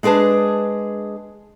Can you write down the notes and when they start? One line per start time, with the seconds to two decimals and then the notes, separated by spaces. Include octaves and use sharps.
0.03 G#3 D4 G#4 B4 A5